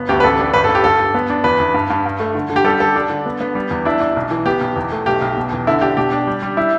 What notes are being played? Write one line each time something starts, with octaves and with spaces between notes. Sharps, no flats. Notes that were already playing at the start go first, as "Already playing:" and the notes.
Already playing: G1 B3
D2 G4
B4
A1 A4
D4
G1 B4
A4
G2
G4
G2 A4
G2
B3
D4
E2 B4
E2
G2
G2
G2
A3
D3
D3
G4
G3 A4
G3 A4
D4
D3
B3
B3
G3
E2
D4 E4
D4
B1
E3
B3 G4
B1
E2
A3
B1 G4
B1
B2
E2
D3 E4
D4 G4
B2 G4
D4
G3
G3
G3 E4